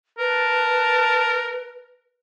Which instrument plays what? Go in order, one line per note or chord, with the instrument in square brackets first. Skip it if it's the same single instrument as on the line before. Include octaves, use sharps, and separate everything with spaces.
[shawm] A#4 [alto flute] B4 [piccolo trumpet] A5